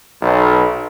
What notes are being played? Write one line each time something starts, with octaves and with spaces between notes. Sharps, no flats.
B1